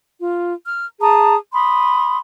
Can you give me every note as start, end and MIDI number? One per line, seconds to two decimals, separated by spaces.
0.19 0.52 65
0.65 0.86 89
1.00 1.35 68
1.00 1.35 81
1.00 1.35 82
1.00 1.35 87
1.54 2.17 83
1.54 2.17 84
1.54 2.17 87